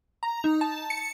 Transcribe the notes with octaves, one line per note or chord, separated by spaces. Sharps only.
A#5
D#4
A5
C#7